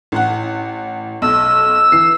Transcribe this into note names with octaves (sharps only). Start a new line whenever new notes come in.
A1 F#5
B1 E6
E3 C7